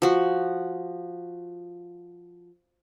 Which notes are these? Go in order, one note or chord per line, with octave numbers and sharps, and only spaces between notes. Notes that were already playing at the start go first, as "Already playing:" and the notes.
F3 F#4